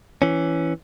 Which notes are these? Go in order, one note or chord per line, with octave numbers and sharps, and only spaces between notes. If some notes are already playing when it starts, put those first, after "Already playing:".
E3 C#4